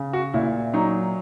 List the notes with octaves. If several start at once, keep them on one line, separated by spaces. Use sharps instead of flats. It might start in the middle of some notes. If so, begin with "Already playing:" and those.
Already playing: C#3
F#4
A#2 E4
F#3 D#4